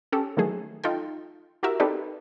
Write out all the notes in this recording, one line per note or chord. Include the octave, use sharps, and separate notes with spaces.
C#4 G4 A4
D#3 E3 F#3 A3 G#4
D#4 F4 A4 G5
E4 F#4 G4 A#4 E5
C4 D#4 G4 A4 B4 D5